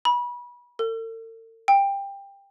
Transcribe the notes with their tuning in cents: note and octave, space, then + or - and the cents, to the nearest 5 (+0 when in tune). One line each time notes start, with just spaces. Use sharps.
B5 -30
A4 +45
G5 +20